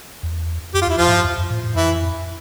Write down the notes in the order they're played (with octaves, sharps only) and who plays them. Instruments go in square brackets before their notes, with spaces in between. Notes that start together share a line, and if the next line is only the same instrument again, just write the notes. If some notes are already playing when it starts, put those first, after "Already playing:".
[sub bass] E2
[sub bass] F2 [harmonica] G4
[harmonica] F4
[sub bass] E2 [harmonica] E4
[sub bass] F2 [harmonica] F3 F4
[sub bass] A2
G2
E2
F2
A2
A2
[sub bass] F2 [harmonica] E3 E4